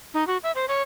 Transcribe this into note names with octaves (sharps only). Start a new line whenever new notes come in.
D#4
F#4
E5
C5
C#5